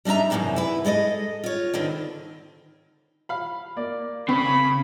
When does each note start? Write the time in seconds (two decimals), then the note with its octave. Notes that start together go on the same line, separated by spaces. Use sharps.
0.05 G3 D4 D#4 E5 A#5
0.30 F#2 A2 C3 E3 D4
0.56 E4 B4
0.85 G#3 A4 C#5 D#5
1.44 F4 C#5
1.74 D3 D#3 C4 B4
3.29 F5 B5
3.76 A#3 D5
4.29 C#3 C4 B5